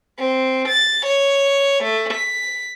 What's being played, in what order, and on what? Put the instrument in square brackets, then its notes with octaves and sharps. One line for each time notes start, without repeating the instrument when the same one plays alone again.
[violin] C4
A6
C#5
A3
B6